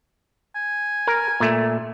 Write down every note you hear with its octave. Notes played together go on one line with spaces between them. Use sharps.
G#5
A#4
A#2 A3